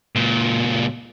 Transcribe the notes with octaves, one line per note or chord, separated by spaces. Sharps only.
C#2 A#2